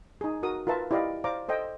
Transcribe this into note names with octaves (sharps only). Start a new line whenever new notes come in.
D#4 G#4
F#4 A#4 D#6
F4 A#4 B4 E5 A5
E4 G4 D5 D#5 F5
C5 D5 F5 A#5 D6
A4 C5 D#5 G5